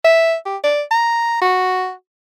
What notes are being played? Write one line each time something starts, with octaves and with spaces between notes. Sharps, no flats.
E5
G4
D5
A#5
F#4